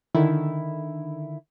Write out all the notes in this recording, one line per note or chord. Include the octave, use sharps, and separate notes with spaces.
D3 D#3 E4